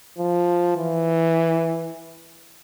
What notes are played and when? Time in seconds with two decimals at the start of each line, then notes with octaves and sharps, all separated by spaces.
0.18 F3
0.77 E3